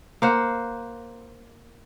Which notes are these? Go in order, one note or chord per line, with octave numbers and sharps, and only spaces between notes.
A#3 C5 F#5